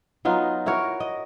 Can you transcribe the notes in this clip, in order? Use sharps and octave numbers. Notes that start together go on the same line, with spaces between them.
F#3 B3 D#4 F4
E4 F#4 A#4 C#5
D#5